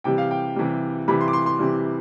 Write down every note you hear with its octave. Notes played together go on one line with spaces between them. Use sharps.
C3 E3 G3 G5
F5
G5
C3 E3 G3
C3 E3 G3 B5
C6
D6
C6
C6
C3 E3 G3